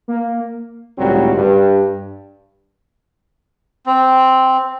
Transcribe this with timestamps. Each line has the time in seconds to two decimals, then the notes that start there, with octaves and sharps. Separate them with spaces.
0.08 A#3
0.98 G#1 C#2 A2 F#3 G3 C4
1.36 G2
3.87 C4